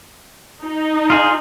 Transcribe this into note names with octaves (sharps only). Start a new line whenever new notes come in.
D#4
F4 G#4